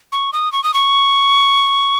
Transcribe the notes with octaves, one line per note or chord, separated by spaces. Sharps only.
C#6
D#6
C#6
D#6
C#6